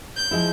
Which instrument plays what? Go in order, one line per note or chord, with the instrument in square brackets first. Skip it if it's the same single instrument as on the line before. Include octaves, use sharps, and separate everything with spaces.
[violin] G6
[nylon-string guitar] F3 G#3 E4